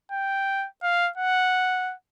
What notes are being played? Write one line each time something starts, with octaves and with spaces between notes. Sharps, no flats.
G5
F5
F#5